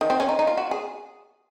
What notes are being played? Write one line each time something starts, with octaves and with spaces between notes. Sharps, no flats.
D#3
C4
C#4
D#4
D#4
F4
F#4
G#4